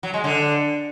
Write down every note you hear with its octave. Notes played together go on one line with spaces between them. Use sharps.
F#3
G#3
D3